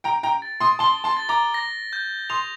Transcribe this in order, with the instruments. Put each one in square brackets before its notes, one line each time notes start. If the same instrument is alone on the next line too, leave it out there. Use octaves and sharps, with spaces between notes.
[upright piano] G5 A#5 [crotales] D7
[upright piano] G5 A#5
[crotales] A6
[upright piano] C6 D#6
[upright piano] A5 C6 [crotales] G7
[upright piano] A5 C6
[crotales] A6
[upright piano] A#5 D6
[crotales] A#6
G6
[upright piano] C6 D#6 [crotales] F7